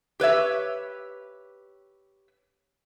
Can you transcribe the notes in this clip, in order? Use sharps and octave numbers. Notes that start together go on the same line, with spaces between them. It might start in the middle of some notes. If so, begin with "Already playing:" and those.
G4 B4 C#5 E5